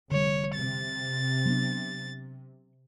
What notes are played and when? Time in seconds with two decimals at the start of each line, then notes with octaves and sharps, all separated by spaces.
0.11 F1 D3 G3 C#5
0.55 C3 A6
1.46 F#3 B3 D4